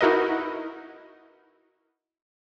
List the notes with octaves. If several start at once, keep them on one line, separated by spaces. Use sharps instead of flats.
D#4 E4 F#4 A#4 B4 D#5